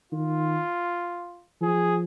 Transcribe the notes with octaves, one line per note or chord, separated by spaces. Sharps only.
D#3 F4
F3 G#4